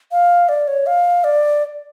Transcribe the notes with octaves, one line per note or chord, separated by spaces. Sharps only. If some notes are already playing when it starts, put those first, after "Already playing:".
F5
D5
C#5
F5
D5